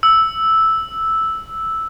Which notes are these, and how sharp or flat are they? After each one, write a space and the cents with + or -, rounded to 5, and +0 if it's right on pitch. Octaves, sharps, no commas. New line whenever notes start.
E6 -5